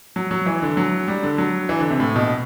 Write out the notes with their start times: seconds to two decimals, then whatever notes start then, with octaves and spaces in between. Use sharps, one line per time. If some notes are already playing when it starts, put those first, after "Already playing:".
0.16 F#3
0.31 F#3
0.46 E3
0.62 D3
0.77 F#3
1.08 G3
1.23 D3
1.38 F#3
1.69 E3
1.80 D3
1.90 C3
2.00 A2
2.16 B2